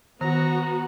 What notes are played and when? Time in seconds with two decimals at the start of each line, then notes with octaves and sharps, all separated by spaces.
0.21 D#3 B3 F#4 A#5